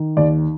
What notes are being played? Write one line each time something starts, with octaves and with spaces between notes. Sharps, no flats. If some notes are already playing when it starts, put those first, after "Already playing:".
Already playing: D#3
D#2 D5